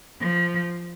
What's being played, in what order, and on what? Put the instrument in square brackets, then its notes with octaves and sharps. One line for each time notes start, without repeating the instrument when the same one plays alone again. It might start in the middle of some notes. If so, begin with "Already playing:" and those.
[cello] F3